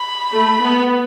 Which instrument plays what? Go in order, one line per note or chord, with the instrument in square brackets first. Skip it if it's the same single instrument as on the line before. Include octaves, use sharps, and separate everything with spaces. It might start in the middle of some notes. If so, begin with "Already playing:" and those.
Already playing: [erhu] B5
[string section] A3
B3